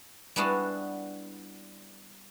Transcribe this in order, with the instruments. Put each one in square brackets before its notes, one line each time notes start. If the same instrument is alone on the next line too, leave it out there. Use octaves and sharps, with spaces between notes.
[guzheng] G3 B3 D4 E4 F#4 G#4